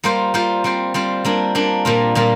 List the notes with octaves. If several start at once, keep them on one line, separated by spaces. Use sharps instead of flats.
G3 A#3 F4 C5
G3 A#3 F4 C5
G3 C4 F4 C5
G3 C4 F4 C5
G3 A#3 D4
G3 A#3 D4
A#2 G3 A#3 F4
A#2 G3 A#3 F4